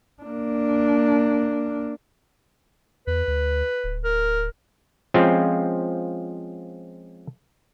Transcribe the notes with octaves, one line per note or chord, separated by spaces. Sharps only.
A#3 D4
E2 B4
D2
D1
A#4
F3 G#3 C4 C#4 F4